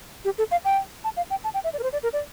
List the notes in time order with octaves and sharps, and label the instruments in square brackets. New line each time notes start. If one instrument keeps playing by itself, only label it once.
[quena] G4
A4
F5
G5
A5
F5
G5
A5
G5
E5
D5
A#4
C5
D5
A#4
D5